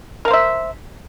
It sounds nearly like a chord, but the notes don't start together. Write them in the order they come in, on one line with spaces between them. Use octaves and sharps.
A#4 F5 C5 E5